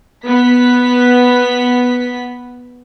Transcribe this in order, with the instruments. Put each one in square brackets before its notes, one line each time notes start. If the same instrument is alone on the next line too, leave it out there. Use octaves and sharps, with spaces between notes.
[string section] B3 B6